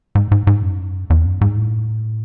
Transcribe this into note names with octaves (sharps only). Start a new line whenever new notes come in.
G#2
G#2
G#2
F#2
E2
F#2
G#2
A2